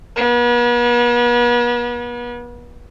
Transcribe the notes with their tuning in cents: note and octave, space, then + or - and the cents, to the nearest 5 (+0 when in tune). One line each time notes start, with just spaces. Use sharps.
B3 -40